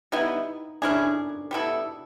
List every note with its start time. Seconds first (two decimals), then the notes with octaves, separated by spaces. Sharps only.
0.12 G3 B3 D#4 E4
0.82 C#4 D4 E4 G#4
1.51 G3 B3 E4 A4